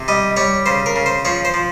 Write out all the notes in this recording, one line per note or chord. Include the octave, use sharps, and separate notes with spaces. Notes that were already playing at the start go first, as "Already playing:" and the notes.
Already playing: C3
G3 D#5
G3 C#5
C#3 C5
A#4
C#3
C5
F3 C#5
C5
F3